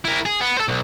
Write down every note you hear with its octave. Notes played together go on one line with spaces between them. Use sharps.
E4 A#4
G#4
B3
A4 C5
B1